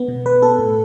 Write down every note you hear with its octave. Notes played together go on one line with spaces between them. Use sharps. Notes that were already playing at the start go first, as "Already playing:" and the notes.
Already playing: B3
B2
B2 B4
B3 A4
A2